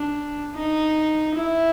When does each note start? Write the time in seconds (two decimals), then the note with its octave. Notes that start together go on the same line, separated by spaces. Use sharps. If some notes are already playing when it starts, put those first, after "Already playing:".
Already playing: D4
0.56 D#4
1.34 E4